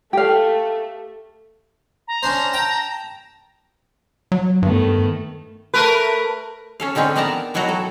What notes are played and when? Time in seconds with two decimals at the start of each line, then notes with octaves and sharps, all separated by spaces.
0.13 A3 G4 F5
2.08 A#5
2.23 C#4 D4 C5
2.53 G5 A5
4.32 F#3
4.62 G2 D#3 A3 B3
5.74 A3 A#4 B4
6.80 C#4 A4 F5
6.95 D3 D#3 G#3 C4 C#4
7.16 D#3 B3 A#4 D5 A5 A#5
7.54 B2 D#3 F#3 E4 F#4 A#5
7.69 A4